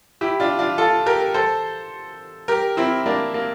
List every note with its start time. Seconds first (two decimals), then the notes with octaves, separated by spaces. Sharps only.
0.21 E4 G4
0.40 D4 F4
0.59 D4 F4
0.78 F4 A4
1.06 G4 A#4
1.34 A4 C5
2.48 G4 A#4
2.77 C4 E4
3.06 A#3 D4
3.34 A#3